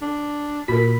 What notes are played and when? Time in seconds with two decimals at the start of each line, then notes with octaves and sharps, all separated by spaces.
0.02 D4
0.68 A#2 F#4 A#4 B5 B6